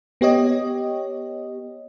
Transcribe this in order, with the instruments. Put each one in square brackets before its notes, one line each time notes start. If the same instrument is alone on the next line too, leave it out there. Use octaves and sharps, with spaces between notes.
[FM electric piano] B3 G4 C#5 D#5